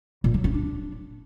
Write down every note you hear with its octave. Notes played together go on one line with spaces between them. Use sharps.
A#2
F#3
C#4
D4